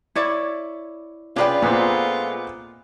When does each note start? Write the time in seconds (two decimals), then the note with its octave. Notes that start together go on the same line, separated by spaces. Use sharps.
0.15 E4 C#5 D5
1.36 C#4 D4 F4 G#4 B4 D5 G5
1.62 A#2 G#3 A3 B3 C4